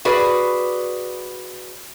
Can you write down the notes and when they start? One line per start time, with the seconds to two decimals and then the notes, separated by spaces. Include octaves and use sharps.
0.05 F#4 G#4 B4 D5